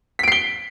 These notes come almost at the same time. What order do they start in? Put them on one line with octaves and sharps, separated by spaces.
B6 D7 C7 G7